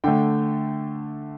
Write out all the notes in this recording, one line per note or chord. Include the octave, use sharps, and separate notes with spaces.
D3 A3 G5